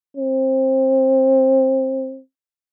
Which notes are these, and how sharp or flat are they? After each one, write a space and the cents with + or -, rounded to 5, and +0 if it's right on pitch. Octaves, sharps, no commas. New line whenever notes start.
C4 +20